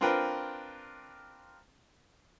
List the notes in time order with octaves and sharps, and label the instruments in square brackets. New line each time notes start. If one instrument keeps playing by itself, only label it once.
[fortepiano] C4 D4 F4 A#4 B4 G5